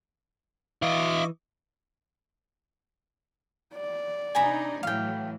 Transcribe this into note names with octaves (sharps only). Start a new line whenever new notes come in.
E3 E4 D#5 F5 C#6 D6
D5
C3 D4 D#4 G#5 A#5 B5
A2 E3 F#3 F5 G5